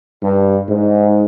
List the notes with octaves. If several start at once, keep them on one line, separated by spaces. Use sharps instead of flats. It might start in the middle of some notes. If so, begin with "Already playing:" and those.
G2
G#2